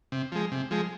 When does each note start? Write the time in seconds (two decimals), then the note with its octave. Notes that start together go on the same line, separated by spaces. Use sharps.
0.12 C3
0.32 F3 G#3
0.52 C3
0.71 F3 G#3